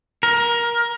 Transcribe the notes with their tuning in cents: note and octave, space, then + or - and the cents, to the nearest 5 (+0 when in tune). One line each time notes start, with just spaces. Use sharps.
A#4 +20